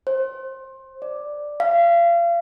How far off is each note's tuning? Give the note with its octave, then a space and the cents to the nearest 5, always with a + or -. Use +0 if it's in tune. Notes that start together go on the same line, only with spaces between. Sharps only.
C5 +20
D5 +5
F5 -35